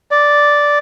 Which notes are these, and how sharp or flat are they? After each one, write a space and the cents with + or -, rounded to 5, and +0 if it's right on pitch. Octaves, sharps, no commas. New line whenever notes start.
D5 -5